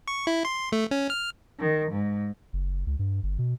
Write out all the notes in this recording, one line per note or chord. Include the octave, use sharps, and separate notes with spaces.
C#6
E4
C6
A3
C#4
F6
D#3
G#2
F#1
C#2
G2
G1
B2